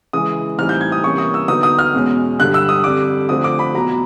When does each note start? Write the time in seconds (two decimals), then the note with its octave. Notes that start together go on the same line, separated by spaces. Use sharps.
0.13 C#3 E3 G#3 D#6
0.58 A2 E3 G3 C4 D#4 F6
0.69 G6
0.81 G#6
0.92 D#6
1.04 C3 E3 G3 A#3 C#4 C#6
1.18 D#6
1.34 E6
1.48 D3 F#3 B3 D#4 D#6
1.63 D#6
1.79 F6
1.94 E2 B2 G#3 C#4
2.39 G2 D3 G3 F#6
2.54 E6
2.69 D#6
2.84 F2 D3 G3 D6
3.29 D3 F3 A3 C4 D#6
3.44 D6
3.59 B5
3.74 E2 B2 F#3 A#5